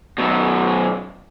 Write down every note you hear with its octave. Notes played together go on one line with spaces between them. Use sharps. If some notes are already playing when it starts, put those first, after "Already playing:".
F#2 B2